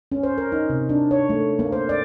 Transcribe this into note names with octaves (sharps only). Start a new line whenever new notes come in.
C#4
C5
A#4
D#4
C3
D4
C#5
A3
A#3
C5
D5